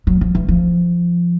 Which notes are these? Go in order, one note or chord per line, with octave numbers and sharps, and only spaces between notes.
F#3
F3
E3
F3